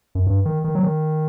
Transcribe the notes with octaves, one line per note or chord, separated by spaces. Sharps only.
F#2
G2
D#3
D#3
F#3
D#3